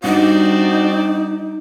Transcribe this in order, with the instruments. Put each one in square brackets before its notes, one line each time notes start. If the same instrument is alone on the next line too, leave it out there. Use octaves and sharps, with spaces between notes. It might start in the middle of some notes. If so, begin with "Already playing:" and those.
[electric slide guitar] G3 D4 F#5 [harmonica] C4 F#4 D5 [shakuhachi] D#4